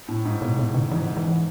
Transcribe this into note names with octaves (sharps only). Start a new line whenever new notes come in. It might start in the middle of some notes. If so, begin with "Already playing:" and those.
A2
G#2
B2
B2
C#3
G#2 E3
E3